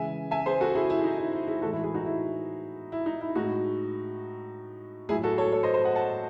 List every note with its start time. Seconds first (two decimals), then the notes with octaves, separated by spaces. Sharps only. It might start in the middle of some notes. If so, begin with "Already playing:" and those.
Already playing: C#3 E3 G#3 E5 G#5
0.31 E5 G#5
0.46 G#4 C5
0.60 F#4 A4
0.75 E4 G#4
0.90 E4
1.04 D#4
1.18 E4
1.33 E4
1.48 E4 G#4
1.62 A2 E3 G#3 F#4 A4
1.73 E4
1.83 E4 G#4
1.94 D#4 F#4
2.06 E4
2.92 E4
3.06 D#4
3.21 E4
3.35 A2 G#3 D#4 F#4
5.09 A2 F#3 E4 G#4
5.24 F#4 A4
5.38 A4 C#5
5.52 A4 C#5
5.63 C5 D#5
5.74 C5 D#5
5.84 D#5 F#5
5.95 F#5 A5